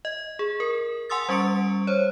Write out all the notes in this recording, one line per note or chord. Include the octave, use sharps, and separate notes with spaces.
D#5
G#4
A#4
F#5 G#5 C6 D#6 E6 A6
G3 C#4 C#6 C#7 D7
C5 C#5